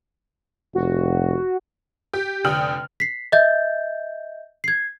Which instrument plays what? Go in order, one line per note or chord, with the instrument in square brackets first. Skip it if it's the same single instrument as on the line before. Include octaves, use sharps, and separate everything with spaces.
[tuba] F1 [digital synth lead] F#4
[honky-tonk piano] G4
F1 D3 G5 D#6 F6 F#7
[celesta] B6 C7
D#5 E5 G6 A6
G#6 C7